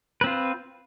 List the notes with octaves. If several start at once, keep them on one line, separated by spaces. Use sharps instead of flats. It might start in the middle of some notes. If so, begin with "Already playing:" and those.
C4 F4 B4